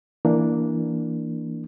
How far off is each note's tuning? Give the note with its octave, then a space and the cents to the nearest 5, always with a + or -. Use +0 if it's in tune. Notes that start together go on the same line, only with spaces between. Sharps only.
E3 +5 A#3 +0 D4 +0